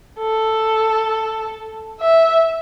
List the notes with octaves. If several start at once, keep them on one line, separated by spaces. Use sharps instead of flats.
A4
E5